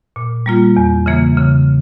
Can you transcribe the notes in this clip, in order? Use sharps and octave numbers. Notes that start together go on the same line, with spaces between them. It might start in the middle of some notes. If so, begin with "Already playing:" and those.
A#2
G3 A#3 F4
E2
C#3 E3 A#3
C#3